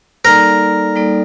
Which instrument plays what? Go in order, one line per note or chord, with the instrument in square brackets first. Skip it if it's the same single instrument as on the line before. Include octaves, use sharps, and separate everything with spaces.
[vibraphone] G3 A#3 D#4 A4 D5 [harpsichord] A#4
[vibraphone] G3 A#3 D#4 A4 D5